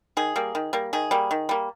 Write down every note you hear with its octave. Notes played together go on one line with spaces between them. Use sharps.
D#3 G#4
G3 A#3
D#3
G3 A#3
D#3 G#4
G3 A#3
D#3
G3 A#3